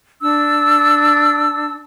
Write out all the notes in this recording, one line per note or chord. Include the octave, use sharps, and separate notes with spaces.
D4 E6